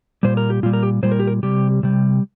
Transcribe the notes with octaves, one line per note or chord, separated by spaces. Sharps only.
A#2 G3 C5
A#4
G4
A#2 G3 F4
A#4
G4
A#2 G3 C5
A#4
G4
A#4
C3 G3 G4
C3 G3